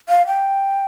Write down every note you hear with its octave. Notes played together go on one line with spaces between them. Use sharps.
F5
G5